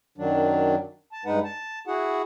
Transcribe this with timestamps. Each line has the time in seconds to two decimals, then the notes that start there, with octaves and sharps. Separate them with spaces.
0.18 F#2 D#3 F#3 D4
1.12 A5
1.25 G2 G#3 D#4 B4 F#5
1.44 A5
1.87 E4 F#4 G#4 F#5